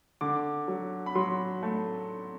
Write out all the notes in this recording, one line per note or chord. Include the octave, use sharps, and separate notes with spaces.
D3 D6
F#3
B5
F#3 C6
A3